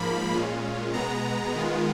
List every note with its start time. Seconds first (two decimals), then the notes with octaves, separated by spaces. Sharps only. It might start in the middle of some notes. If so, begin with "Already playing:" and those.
Already playing: G#2 F3 A#3 B5
0.34 A#2 G#3 C#4 F4
0.93 B2 G#3 B3 A#5
1.55 D#3 G#3 B3 F4